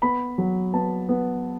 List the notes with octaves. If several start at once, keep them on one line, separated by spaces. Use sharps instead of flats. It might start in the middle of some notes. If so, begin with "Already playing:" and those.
B3 B5
F#3
B3 A5
B3